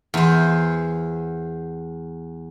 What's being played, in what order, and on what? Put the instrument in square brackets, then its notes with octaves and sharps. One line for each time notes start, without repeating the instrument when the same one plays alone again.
[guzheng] E2 C5